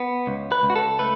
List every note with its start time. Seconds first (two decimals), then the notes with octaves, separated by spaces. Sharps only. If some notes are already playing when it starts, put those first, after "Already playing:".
Already playing: B3
0.27 C#2
0.52 B4
0.63 C#2
0.70 F#4
0.76 A4
0.99 A3 B4